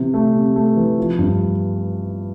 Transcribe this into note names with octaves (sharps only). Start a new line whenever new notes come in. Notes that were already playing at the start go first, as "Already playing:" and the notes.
Already playing: C3 E3
A3
C3
A3
E3
F3
G2